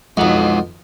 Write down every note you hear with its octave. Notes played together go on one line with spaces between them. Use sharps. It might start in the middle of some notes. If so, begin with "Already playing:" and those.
B1 F2 G#3 F#5